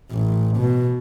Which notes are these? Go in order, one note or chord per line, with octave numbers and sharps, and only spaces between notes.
A1
B2